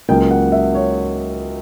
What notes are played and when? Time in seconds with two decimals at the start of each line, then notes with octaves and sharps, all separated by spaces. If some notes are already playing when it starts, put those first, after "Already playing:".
0.09 C#2 C#3 F#3 A#3 G5
0.31 F#5
0.52 E5
0.75 C#5